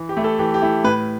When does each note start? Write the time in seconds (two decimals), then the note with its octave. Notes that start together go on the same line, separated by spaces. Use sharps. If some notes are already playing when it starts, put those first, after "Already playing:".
Already playing: E3
0.09 G4
0.17 A3 E4
0.24 A4
0.39 E3 G4
0.54 G4
0.62 A3 E4
0.84 A2 B4